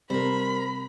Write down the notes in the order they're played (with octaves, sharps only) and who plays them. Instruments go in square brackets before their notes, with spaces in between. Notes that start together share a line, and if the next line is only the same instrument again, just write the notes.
[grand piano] C3 [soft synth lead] G3 [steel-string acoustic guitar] A#4 C5 [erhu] B5